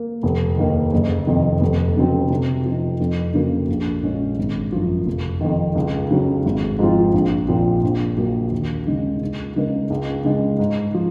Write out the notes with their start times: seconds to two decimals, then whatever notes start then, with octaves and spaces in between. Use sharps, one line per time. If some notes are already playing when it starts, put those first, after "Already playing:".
Already playing: A#3
0.23 F1
0.57 D#2 D#3 A#3
0.93 F#1
1.27 F2 C3 D#3
1.61 F1
1.96 F2 C#3 F#3 C4
2.30 C3
2.65 F3 C4 D#4
3.00 F2
3.34 C#3 F#3 A#3
3.68 A#1
4.03 A#2 G#3 C#4
4.38 G#1
4.72 F#2 F3
5.06 F1
5.41 F2 D#3
5.75 C#2
6.11 C#3 F#3 C#4
6.46 G#1
6.79 G#2 F3 C4 F4
7.14 A#1
7.48 A#2 F3 C4
7.83 A#1
8.17 A#2 F#3 A#3
8.52 D#2
8.87 C#3 G#3 D#4
9.22 C#2
9.56 C#3 G#3 D#4 A#4
9.90 C#2
10.25 C#3 G#3
10.59 G#2
10.94 F3